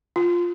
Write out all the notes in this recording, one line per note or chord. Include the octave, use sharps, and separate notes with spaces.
F4